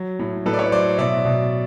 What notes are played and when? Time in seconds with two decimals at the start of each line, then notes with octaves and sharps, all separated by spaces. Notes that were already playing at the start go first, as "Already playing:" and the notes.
Already playing: F#3
0.19 A2
0.46 A2 A4 B4
0.53 D5
0.59 B4 C#5
0.72 F#3 C5 D5
0.98 B2 D5 E5
1.25 B2